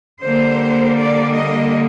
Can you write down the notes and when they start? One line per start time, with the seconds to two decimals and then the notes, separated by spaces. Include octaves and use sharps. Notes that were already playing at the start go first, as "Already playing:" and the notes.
0.21 D3 G3 A#3 C5
0.97 D5
1.34 D#5